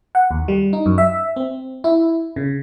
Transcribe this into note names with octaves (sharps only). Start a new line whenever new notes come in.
F#5
D#2
G3
D#4
F#2
E5
C4
E4
C#3